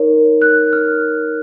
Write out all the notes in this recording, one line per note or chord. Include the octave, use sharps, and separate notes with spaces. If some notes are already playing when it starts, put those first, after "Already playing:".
Already playing: D#4 A#4 C#5
F#6
F6